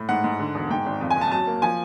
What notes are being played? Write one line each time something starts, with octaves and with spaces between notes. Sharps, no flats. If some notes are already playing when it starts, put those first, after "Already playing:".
Already playing: A2
G#2 F#5
G#2
D3
E1
G#2 G5
G#1
F2
G#5
F#1
A5
F#3 A5
A#3
F3 G#5